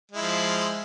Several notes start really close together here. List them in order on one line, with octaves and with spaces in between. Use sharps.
G#3 E4 F3